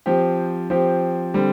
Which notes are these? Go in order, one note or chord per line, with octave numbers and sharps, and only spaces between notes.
F3 C4 G4
F3 C4 G4
D3 G3 C4